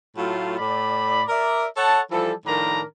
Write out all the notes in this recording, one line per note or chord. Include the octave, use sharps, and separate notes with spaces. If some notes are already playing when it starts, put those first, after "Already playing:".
A2 F#3 A3 F4
A2 D5 B5
A#4 D5 E5
A4 C#5 F#5 A5
E3 F3 G3 A4
A2 D#3 F3 D4 A#4 A#5